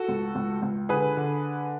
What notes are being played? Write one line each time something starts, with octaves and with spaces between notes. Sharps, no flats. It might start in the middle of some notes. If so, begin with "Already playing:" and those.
Already playing: F#4 A4
C#2
C#2
C#2
D3 G#4 B4
D3